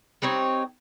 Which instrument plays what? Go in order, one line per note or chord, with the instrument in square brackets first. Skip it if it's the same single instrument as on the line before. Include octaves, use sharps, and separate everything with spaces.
[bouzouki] G3 C4 D#4 C#5